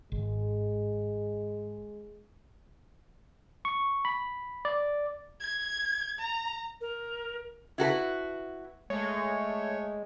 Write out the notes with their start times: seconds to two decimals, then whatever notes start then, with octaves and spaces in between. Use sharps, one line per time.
0.12 G#1 G#3
3.65 C#6
4.05 B5
4.65 D5
5.41 G#6
6.19 A#5
6.80 A#4
7.78 E4 F#4 A4 B4
8.90 G#3 A3 C#5